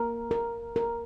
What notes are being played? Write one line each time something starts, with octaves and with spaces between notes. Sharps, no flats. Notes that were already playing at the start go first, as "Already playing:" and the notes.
Already playing: A#4
A#4
A#4